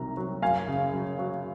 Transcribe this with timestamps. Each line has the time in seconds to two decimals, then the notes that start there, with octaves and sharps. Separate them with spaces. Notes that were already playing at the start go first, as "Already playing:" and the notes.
Already playing: C2 C3 D#3 F#3 A#5
0.17 F#3
0.42 F#2 F5 G#5
0.68 C#3
0.94 F#3
1.19 F#3